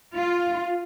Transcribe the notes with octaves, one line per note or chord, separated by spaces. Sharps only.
F4